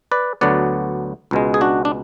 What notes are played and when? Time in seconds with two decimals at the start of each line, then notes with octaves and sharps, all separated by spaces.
0.12 B4 D5
0.41 D2 D3 F#3 B3 D5 F#5
1.31 C#2 B2 G#3
1.54 G#4
1.61 D4 F#4
1.85 D4